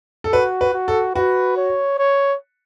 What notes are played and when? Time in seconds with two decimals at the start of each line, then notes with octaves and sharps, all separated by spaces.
0.24 A4
0.33 F#4 B4
0.61 B4
0.74 F#4
0.88 A4
1.15 F#4 B4
1.57 C#5
1.98 C#5